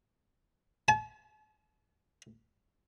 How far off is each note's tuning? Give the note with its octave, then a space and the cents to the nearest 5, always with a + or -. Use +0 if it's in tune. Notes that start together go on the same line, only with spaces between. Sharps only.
A5 -45